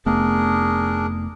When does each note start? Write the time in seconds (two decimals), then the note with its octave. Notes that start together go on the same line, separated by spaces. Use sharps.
0.06 F1 A3 B3 D4 G#4 A#4